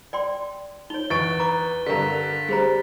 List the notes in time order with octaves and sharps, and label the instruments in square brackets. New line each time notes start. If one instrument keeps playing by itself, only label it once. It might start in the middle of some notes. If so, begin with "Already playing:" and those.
[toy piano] D5 G5 C6
[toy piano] D#4 C#5 [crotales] G7
[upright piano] E2 C#6 D7 [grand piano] B4 [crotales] A6
[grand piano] B4 [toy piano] A#5 D6
[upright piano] G2 D3 [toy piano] G4 A#4 A#5 [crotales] B6
[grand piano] G3 [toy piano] G#4 C5 A#5